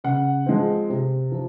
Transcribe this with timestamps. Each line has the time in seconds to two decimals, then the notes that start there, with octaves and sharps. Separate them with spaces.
0.04 C#3 F#5
0.46 F3 G#3 C4
0.90 C3
1.32 F3